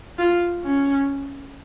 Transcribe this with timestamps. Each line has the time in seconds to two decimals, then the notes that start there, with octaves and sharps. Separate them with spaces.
0.19 F4
0.65 C#4